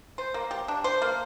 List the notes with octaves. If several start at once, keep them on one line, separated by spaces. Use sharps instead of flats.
C5
A#3
G4
D4
C5
A#3